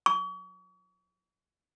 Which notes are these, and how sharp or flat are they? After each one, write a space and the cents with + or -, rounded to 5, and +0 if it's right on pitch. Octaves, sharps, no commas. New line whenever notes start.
C#6 +40